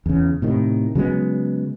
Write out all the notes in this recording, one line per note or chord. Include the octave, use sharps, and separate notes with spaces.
E2 C#3
A2 C3 D#3
C#3 F#3 G#3 B3